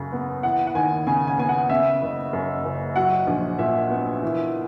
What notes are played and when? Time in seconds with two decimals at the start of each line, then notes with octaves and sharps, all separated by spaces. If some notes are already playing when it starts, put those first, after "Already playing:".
Already playing: F#2 C#3
0.12 B3
0.43 E3 F#5
0.67 F#5
0.75 D#2 G#5
1.07 C#3 G#5
1.27 G#5
1.39 B3 G#5
1.49 F#5
1.69 C#3 E5
2.02 F#1
2.33 F#2
2.65 F#1
2.96 F#3 F#5
3.27 A#1
3.59 A#2 E5
3.91 B3
4.23 E3